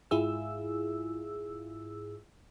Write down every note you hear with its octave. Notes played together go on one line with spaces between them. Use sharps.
G#2 E4 F4 G#4 E6